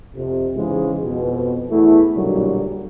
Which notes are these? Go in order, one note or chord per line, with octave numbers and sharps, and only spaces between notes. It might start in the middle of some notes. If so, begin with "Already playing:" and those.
F2 C3
F2 G#2 C#3 E3 F3 G#3
F2 B2
E2 A3 E4
B1 A#2 D3 F#3 G3